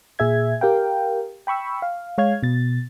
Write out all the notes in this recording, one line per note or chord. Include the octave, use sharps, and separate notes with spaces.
A#2 G#4 E5 G#6
G4 A#4 F5 G5
G5 B5 C#6 E6
F5
G#3 C#5 F5 F6 G#6
B2 A6